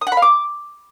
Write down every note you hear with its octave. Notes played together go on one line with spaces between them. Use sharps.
D#6
F#5
B5
F5
D6